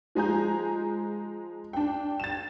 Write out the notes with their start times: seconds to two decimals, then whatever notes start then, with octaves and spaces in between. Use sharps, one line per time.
0.15 F3 G#3 G#5 A#5 G6
1.73 D4 G5
2.20 A6 E7